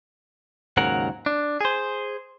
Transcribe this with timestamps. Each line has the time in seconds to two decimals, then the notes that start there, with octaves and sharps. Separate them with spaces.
0.77 D#2 G#2 C#3 F#3 A#4 F#5
1.26 D4
1.61 G#4 C5